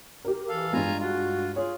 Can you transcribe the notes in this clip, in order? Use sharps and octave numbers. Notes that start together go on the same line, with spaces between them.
G4 A#4
E3 A4 F5
G2 G#3 F4 G#5 A#5
F4 F#4
F4 G#4 C#5